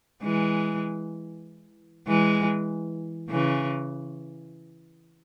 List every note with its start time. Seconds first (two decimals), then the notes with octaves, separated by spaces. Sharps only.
0.23 E3 G#3
2.08 E3 G#3
3.30 C#3 E3